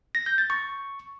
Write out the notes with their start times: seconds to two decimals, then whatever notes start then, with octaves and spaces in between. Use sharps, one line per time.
0.15 A#6
0.26 G6
0.38 A6
0.50 C#6